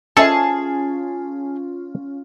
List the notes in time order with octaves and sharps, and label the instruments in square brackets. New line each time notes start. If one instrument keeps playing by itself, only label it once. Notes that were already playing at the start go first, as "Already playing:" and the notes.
[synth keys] C#4 F4 [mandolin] G#4 A5 [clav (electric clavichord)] A4 [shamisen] C5 D#5 E5